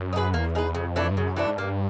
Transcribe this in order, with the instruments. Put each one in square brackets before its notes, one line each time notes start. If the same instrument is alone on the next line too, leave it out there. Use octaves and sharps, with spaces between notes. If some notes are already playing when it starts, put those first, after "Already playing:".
Already playing: [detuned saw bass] F#2
[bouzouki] D#4
G#4 B4
[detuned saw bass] E2 [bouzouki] A#3
[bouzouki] D#4 G#4 B4
[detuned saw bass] F2 [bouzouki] C#3
[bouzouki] E3 A3 D4
[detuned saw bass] G2
[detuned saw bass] F#2 [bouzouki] C#3
[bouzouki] E3 A3 D4
[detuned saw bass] G#2
[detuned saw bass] G2 [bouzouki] A#3